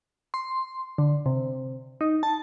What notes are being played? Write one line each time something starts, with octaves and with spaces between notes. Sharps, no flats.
C6
D3
C3
D#4
A5